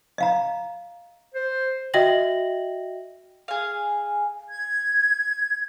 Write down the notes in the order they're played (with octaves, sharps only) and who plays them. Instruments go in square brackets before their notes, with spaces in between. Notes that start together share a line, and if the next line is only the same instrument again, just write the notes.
[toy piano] D#5 F5 A#5
[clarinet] C5
[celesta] F#4 D#5 E5 G5 A#6 F#7
[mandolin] G#4 F5
[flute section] G#6